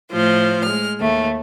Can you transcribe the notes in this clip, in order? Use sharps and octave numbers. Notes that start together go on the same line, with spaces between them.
A2 F3 C5
G#3 F6
D#2 A3